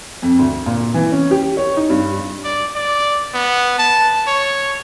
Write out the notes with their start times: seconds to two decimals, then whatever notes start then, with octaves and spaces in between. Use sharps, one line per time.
0.22 F2
0.39 D2
0.66 A#2
0.94 E3
1.12 C#4
1.31 G4
1.57 C#5
1.77 D#4
1.90 G2
2.44 D5
2.75 D5
3.34 B3
3.78 A5
4.27 C#5